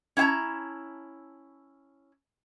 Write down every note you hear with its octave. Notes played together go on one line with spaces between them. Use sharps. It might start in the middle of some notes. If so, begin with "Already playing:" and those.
C#4 E4 F#5 A5 A#5